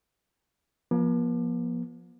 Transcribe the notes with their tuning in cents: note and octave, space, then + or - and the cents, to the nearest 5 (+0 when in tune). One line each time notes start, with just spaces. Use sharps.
F3 +0 A#3 +45